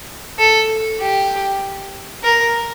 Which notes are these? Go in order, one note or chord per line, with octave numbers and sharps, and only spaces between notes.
A4
G4
A#4